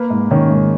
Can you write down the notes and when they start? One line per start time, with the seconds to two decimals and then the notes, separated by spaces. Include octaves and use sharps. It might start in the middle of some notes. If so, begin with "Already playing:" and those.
Already playing: A#3 B4
0.10 G#2
0.31 D#3 C#4
0.51 G#2